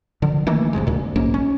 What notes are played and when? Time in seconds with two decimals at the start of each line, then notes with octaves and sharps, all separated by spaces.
0.22 D3 F3
0.47 D#3 E3 A3 A#3
0.73 D1 F2 C3 G#3
0.87 D2 A#2
1.16 B1 G#2 A#3 C#4
1.34 C#4